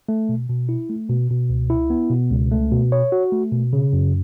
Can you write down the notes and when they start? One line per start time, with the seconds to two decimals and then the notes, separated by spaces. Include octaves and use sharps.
0.09 A3
0.29 B2
0.50 B2
0.69 E4
0.90 A3
1.09 B2
1.30 B2
1.50 C#2
1.70 E4
1.90 B3
2.10 B2
2.31 C#2
2.51 A3
2.71 B2
2.92 C#5
3.12 F#4
3.32 A3
3.52 B2
3.73 C#3
3.93 F#2